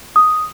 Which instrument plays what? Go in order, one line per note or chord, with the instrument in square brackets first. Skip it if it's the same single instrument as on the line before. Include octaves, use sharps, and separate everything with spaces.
[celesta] D#6